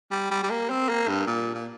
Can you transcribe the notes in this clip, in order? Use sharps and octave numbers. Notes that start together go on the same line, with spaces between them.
G3
G3
G3
A#3
C4
A#3
G2
A#2
A#2